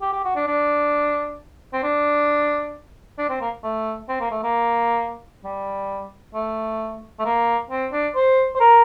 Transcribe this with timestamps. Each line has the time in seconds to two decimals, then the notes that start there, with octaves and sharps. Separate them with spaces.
0.01 G4
0.12 G4
0.24 F#4
0.35 D4
0.47 D4
1.73 C4
1.83 D4
3.18 D4
3.29 C4
3.41 A#3
3.63 A3
4.08 C4
4.20 A#3
4.31 A3
4.43 A#3
5.44 G3
6.34 A3
7.19 A3
7.25 A#3
7.70 C4
7.92 D4
8.15 C5
8.55 C5
8.60 A#4